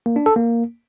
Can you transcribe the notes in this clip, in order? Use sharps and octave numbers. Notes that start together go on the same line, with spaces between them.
A#3
D4
A4
A#3